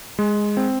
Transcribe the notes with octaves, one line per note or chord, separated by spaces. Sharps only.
G#3
C4